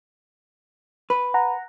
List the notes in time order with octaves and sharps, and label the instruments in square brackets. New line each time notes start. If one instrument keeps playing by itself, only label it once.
[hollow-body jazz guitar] B4
[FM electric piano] F#5 A#5